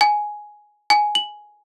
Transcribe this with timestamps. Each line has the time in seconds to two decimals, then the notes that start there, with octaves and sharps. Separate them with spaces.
0.01 G#5
0.90 G#5
1.15 F#7